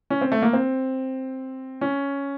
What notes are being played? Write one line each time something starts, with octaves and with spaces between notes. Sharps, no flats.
C#4
C4
A3
A#3
C4
C#4